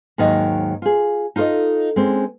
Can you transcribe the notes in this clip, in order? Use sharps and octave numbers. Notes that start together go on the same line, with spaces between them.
D#2 G#2 D#3 F#3 D#5
F4 G#4
D#4 F4 A4 C5 D#5
G#3 C4 C#4